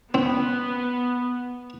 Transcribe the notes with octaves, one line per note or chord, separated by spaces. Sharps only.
B3 C4